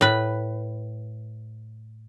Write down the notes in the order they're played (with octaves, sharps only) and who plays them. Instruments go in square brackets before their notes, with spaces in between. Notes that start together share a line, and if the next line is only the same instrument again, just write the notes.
[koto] A2 B4